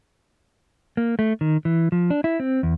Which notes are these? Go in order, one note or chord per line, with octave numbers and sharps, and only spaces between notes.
A#3
A3
D#3
E3
F3
D4
E4
C4
E2